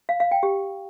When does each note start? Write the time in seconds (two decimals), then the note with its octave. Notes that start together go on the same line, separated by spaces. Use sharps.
0.09 F5
0.20 F5
0.31 G5
0.43 G4